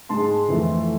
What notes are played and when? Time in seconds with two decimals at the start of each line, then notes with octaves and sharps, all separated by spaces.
0.09 G#2 G#3 A5 C6
0.48 F2 E3 A3